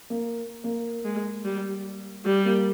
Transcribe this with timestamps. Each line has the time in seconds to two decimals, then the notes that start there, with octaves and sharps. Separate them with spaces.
0.10 A#3
0.64 A#3
1.05 G#3
1.45 G3
2.26 G3
2.45 A#3